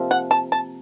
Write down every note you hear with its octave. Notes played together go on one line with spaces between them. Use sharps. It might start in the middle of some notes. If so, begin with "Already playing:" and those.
Already playing: C3 F3 A#3
F#5
A5
A5